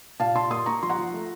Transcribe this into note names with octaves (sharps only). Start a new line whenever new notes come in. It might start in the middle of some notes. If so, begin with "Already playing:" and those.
A#2 F5 A5
A#2 A5 C6
A#3 C6 D#6
A#3 A#5 C#6
F3 C6
F#5 A#5
F3
A3